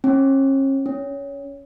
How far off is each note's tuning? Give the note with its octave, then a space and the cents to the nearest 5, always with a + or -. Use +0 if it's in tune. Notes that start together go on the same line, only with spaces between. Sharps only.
C#4 -40
C#4 +15